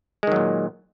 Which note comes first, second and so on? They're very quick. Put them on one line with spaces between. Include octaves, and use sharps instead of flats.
G#3 D#3 F#3 A#2